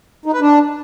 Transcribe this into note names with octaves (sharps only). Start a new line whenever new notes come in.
D#4
B4
D4